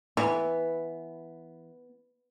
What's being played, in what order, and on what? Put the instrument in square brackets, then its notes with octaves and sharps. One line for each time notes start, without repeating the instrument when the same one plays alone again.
[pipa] E3 [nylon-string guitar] B3